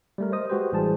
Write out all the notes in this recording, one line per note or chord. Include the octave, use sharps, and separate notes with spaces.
G3 A3 A#4
C5 D#5 D#6
G#3 F#4 G4 B4 C5
A1 E3 G3 G#4 C5 A5